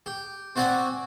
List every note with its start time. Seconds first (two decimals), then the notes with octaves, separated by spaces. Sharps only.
0.06 G4
0.56 C4 F#4 D5 F#5 G#5